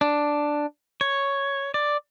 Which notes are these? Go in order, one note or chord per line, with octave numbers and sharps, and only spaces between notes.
D4
C#5
D5